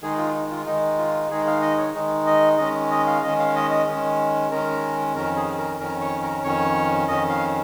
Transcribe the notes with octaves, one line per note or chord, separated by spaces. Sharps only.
D#3 G#3 D#4 G#4
F4
D#4
F4
D#3 G#3 D#4
F4
D#3 G#3 D#4 G#4
F5
D#5
C#5
D#3 G#3 D#4
D#5
D#3 G#3 C#4 D#5
D#5
F5
D#3 G#3 C#4 D#5
F5
D#5
D#5
D#3 G#3 C#4
D#3 G#3 C#4 A#4
F2 D#3 C#4 A#4
G#4
A#4
F2 D#3 C#4 A#4
C#5
A#4
F2 D#3 C#4 C#5
F2 D#3 C#4 D#5
F5